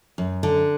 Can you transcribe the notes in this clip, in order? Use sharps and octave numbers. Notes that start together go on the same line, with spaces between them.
F#2
D3